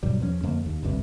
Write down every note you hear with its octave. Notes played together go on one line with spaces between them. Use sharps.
G2 B2 F#3 G3
E2 F3 G3 C#4
F2 D3 A3 A#3
D#2
G#1 D2 G2 C3